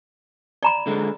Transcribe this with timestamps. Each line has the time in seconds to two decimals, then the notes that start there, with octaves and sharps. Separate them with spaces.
0.63 D5 A#5 B5
0.87 D3 G#3